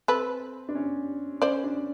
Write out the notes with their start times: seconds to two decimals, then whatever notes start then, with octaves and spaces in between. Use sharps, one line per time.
0.08 C4 A4 B4
0.69 D4
0.75 C#4
1.42 C#4 C5 D5
1.64 D4